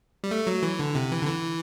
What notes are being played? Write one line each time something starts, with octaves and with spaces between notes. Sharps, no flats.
G3
A3
F#3
E3
D3
C3
E3
D3
E3